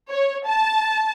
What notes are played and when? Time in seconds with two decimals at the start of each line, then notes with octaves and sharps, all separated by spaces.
0.10 C#5
0.45 A5